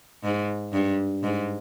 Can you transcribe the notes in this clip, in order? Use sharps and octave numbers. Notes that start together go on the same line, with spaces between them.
G#2
G2
G#2